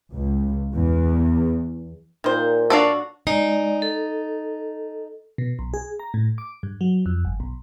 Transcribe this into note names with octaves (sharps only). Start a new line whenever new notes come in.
C#2
E2
A#2 D#3 C5
F#3 D4 F#4 A4 D5 F5
G#3 D#4 D5
A4
B2
B1
G#4
A#5
A2
D6
G2
F#3
F2
G1
B1